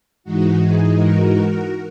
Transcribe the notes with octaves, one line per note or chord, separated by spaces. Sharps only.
G#2 E3 G#3 D#4 F#4
G#4
F#4 A#4